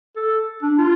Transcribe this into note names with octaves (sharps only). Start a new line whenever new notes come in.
A4
D4
F4